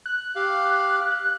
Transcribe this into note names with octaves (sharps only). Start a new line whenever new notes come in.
F#6
G4 F5